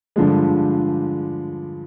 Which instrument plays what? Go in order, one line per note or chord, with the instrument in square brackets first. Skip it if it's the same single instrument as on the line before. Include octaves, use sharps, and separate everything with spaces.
[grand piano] G2 D3 F3 G#3